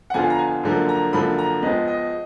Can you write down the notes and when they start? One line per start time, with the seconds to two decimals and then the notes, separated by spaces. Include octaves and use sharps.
0.10 F#5
0.14 F2 D3 F3 B3 F4 G#5
0.30 A#5
0.39 G#5
0.63 F#2 D3 F3 A#3
0.89 A#5
1.13 F#2 D3 F3 A#3 B5
1.38 A#5
1.62 F2 F3 G#3 B3 D#5
1.87 D#5